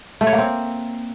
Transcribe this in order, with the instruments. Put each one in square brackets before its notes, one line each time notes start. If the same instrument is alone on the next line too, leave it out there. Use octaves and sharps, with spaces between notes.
[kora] A3
C#5
A#3
C4